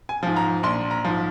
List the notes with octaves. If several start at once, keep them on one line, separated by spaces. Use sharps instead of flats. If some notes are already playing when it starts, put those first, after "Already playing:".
G#5
G#2 F3
A#5
A#1 C6
A#5
G#2 F3